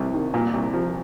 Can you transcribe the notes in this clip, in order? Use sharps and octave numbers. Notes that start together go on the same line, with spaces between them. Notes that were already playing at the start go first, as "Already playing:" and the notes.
Already playing: C2 C3
D#3
A#2
C2
F3